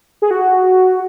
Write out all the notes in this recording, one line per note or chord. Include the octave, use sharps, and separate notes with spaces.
G#4
F#4